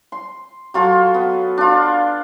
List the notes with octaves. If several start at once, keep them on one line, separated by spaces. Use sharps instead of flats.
C6
F#3 F4 A4
B3
D4 F4